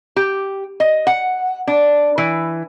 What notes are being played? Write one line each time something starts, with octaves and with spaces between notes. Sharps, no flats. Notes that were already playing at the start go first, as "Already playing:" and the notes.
G4
D#5
F#5
D4
E3